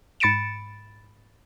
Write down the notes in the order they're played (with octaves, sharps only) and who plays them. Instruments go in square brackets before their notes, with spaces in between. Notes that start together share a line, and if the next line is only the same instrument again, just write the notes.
[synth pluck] G#2 B5 A6 C#7 D7 E7